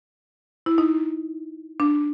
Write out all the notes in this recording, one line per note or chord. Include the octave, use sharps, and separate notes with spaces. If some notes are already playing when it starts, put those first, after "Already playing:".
E4
D#4
D4